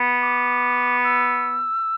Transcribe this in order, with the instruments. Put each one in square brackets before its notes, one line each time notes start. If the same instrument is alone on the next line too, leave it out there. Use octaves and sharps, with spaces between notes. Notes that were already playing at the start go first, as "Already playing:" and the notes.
Already playing: [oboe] B3
[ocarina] D6
E6